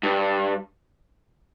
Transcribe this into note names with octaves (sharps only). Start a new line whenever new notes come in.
G2